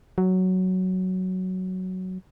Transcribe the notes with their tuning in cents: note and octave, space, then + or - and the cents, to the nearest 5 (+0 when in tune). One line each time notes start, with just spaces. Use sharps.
F#3 +5